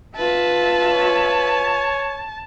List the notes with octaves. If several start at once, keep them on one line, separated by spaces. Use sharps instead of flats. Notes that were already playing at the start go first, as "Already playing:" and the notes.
F4 B4 E5 A5
C#5